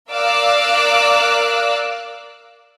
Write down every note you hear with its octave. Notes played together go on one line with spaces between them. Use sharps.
A#4 D5 F5 D6 E6 F#6